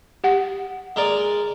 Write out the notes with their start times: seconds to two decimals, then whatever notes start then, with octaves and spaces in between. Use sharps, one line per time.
0.24 G4 F#5
0.96 G#3 A#4 D5